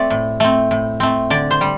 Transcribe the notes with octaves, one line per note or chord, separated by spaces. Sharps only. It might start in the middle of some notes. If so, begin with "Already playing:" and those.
Already playing: A3 C4 D5
A2
A3 C4
A2
A3 C4
D3 D5
C5
G3